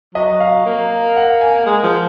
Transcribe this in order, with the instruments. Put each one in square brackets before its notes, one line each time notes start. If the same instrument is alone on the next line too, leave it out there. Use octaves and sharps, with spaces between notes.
[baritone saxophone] F#3 [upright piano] D#5
[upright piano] F5
[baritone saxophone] A#3
[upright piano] F#5
G#5
[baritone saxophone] G#3
F3